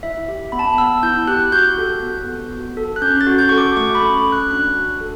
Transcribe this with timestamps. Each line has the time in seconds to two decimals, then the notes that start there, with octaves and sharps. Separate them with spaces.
0.03 E4 E5
0.28 G4
0.52 B3 B5
0.59 A5
0.78 B3 E6
1.03 E4 G6
1.27 G4 F#6
1.52 F#4 G6
1.78 A4
2.02 B3
2.27 B3
2.52 F#4
2.77 A4
2.96 F#6
3.02 C#4 G6
3.21 A6
3.27 F#4
3.39 G6
3.49 A4 C#6
3.58 D6
3.76 A3 C#6
3.95 B5
4.01 C#4
4.26 F#4
4.32 F#6
4.50 D4 F#6
4.75 F#4
5.01 A4